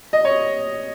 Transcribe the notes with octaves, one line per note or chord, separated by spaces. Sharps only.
D#5
C#5